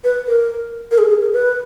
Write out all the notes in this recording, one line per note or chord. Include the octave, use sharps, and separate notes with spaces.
B4
A#4
A#4
G#4
G#4
A#4
B4